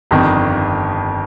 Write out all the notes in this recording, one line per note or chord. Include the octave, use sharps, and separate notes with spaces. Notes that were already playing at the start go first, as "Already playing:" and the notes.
G1 F2 D#3